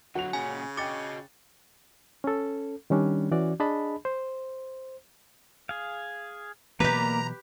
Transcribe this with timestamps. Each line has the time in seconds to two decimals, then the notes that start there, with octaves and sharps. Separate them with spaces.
0.15 D3 F#3 F#4 F7
0.33 A#2 C#3 C#4 G#5
0.77 F#4 D#5 G5 D6 A6 C#7
2.24 C#4 A4
2.90 D#3 G3 C#4 D4
3.31 E3 C#4 F#4 D5
3.60 D4 G#4 D#5 A5 B5
4.05 C5
5.69 G#4 F5
6.80 B2 E3 F#3 A#3 G4 B4 D5 A#5